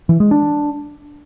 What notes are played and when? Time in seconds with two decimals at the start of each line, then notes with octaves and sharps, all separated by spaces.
0.09 E3
0.20 G#3
0.31 D4